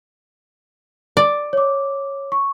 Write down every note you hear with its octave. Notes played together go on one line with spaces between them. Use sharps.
D5
C#5 D6
C#6